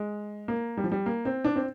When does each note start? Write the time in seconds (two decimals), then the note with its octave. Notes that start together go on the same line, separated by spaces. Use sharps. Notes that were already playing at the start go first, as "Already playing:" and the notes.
Already playing: G#3
0.48 A#3
0.77 G3
0.84 F3
0.92 G3
1.06 A#3
1.25 C4
1.44 D4
1.56 C4